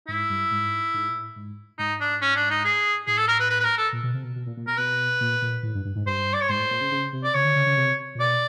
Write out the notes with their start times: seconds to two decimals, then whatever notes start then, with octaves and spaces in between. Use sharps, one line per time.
0.08 G#2 E4
0.30 G2
0.51 G#2
0.94 G#2
1.09 A#2
1.15 A2
1.36 G#2
1.78 G#2 D#4
2.01 D4
2.22 C#4
2.36 D4
2.50 D#4
2.65 G#4
3.07 A2 G#4
3.18 A4
3.28 A#4
3.40 B4
3.50 B4
3.60 B4
3.64 A#4
3.78 A4
3.93 A#2
4.03 B2
4.14 C3
4.24 B2
4.36 B2
4.46 A#2
4.57 A#2
4.67 B2 A#4
4.77 B2 B4
5.21 A#2
5.42 A#2
5.63 A2
5.75 G2
5.85 G2
5.95 G#2
6.06 G2 C5
6.33 D5
6.41 C#5
6.49 G#2 C5
6.59 A2
6.71 A#2
6.81 C#3
6.92 C#3
7.13 C3
7.24 D5
7.34 C#3 C#5
7.45 D3
7.56 C#3
7.66 C#3
7.77 C3
8.15 A#2
8.19 B2 D5